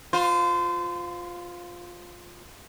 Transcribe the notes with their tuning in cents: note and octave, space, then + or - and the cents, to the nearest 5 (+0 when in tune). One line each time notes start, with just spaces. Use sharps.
F4 +10 C5 -30